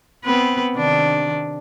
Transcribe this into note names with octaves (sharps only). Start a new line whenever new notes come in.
B3 C4 B4
C3 D#3 D4